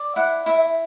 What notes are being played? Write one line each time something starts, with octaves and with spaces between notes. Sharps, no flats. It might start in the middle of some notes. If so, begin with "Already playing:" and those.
Already playing: D5
E4 F#5
E4 E5